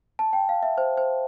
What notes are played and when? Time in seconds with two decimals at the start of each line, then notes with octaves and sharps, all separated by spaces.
0.19 A5
0.33 G5
0.49 F5
0.63 E5
0.78 C5
0.97 C5